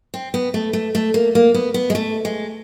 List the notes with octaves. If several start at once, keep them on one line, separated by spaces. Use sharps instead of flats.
C4
B3
A3
A3
A3
A#3
A#3
B3
B3
G#3
A3
G#3